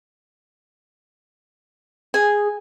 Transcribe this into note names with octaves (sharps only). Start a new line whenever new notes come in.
G#4 G#5